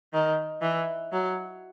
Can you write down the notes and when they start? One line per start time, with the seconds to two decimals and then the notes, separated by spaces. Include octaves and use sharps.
0.14 D#3
0.62 E3
1.12 F#3